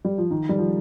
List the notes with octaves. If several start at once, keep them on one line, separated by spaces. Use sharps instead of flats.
G3
F3
D#3
G3
F3